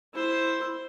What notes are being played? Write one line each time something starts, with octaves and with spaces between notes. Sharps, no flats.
E4 C5